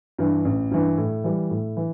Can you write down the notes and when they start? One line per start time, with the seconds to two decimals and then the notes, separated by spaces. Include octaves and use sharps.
0.19 G2 E3
0.45 A1
0.71 G2 E3
0.98 A2
1.24 E3 G3
1.50 A2
1.77 E3